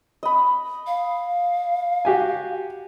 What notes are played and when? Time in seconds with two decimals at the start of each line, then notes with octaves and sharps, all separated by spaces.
0.23 D#5 B5
0.87 F5
2.05 F#4 G4 G#5